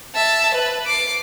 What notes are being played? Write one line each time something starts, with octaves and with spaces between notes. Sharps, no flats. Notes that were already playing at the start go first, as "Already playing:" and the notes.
E5 A5
B4
D6 C7